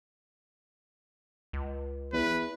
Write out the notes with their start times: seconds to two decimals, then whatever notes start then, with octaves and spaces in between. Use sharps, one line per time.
1.53 C#2
2.13 E2 B4